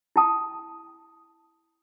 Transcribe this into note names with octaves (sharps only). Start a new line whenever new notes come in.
E4 G5 A5 D#6